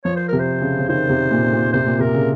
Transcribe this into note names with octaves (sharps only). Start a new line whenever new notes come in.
F3 C#5
C5
C3 A#4
C5
C#3
C#3
D#3 C5
C3
A#2
A#2
C3 C5
A#2
C3 A#4
C#3